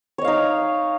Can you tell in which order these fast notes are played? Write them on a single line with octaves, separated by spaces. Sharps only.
C#5 D#5 F5 D#4